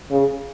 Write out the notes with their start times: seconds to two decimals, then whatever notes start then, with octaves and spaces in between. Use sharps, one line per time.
0.10 C#3